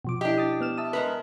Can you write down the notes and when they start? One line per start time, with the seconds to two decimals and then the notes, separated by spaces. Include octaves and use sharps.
0.05 B2 F3 D6
0.21 D4 E4 G4 D#5
0.38 D#6 A6
0.61 B3 F6 E7
0.77 E5 A5 D#6
0.93 G#3 A#4 B4